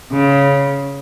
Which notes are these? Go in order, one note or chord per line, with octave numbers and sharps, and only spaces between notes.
C#3